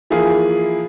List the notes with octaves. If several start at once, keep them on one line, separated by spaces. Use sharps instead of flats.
E3 F3 A#3 E4 F4 G#4